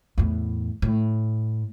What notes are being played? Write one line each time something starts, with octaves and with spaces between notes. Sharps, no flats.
E2 A2
A2